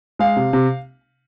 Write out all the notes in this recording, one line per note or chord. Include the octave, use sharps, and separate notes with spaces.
G#3 F5
C3
C3